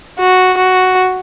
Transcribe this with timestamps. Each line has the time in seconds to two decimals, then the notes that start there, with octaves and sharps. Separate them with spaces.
0.19 F#4
0.58 F#4